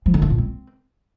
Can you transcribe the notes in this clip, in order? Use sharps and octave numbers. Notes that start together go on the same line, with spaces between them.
F3
D3
D4
A#2
C4